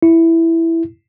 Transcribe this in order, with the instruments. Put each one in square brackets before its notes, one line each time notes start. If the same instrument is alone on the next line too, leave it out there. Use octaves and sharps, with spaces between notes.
[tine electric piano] E4